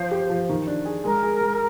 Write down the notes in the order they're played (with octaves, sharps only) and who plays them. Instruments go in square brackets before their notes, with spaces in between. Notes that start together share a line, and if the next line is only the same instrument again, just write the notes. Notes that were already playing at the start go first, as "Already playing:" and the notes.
Already playing: [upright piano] F3 [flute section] C5
[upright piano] G4
F3
D#3
D4
G#4
[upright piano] G#3 [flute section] A#4
[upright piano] G#4
G#3